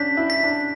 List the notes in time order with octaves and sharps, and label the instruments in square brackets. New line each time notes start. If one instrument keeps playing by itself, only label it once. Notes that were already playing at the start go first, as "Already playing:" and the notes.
Already playing: [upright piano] C#4 D4 [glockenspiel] G6 B6
[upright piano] E4
[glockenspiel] B6
[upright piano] D4